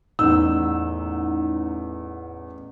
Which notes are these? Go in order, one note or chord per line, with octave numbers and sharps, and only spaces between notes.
A1 E2 D#4 E6